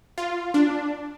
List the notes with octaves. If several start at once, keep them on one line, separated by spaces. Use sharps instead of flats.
F4
D4